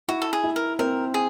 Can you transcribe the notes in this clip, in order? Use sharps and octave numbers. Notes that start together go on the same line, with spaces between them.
E4 F#4
A4
G#4
E4
A#4
C4 A#4
G#4